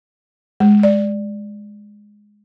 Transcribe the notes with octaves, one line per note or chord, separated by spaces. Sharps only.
G#3
D5